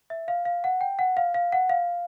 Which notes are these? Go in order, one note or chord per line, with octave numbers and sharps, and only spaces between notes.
E5
F5
F5
F#5
G5
F#5
F5
F5
F#5
F5